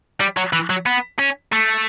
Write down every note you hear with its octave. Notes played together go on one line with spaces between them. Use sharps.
G3
F#3
E3
F#3
B3
C#4
A3